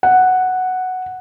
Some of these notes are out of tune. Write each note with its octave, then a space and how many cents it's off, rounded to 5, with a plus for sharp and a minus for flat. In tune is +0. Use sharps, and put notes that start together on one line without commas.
F#5 +0